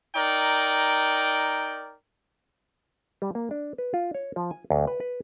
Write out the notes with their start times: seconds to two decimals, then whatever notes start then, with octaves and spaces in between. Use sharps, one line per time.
0.16 D#4 A#4 D5 G5
3.22 G3
3.35 A#3
3.51 D4
3.78 B4
3.94 F4
4.15 C#5
4.36 F3
4.51 G#5
4.70 D2
4.87 B4
5.00 B4